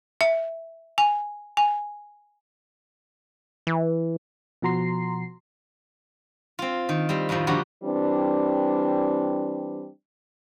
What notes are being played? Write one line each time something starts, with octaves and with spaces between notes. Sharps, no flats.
E5
G#5
G#5
E3
B2 F3 F#4 A#5 C6 C7
C4 F4
D#3
G3 C4
F2 A2 D#3 F3
D3 F3 G3 A#3 F#4
E3 G3 C4 D4